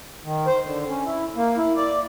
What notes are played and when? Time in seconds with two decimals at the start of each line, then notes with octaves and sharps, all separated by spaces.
0.24 D#3
0.47 C5
0.64 D3
0.87 C#4
1.05 E4
1.36 A#3
1.57 E4
1.76 D5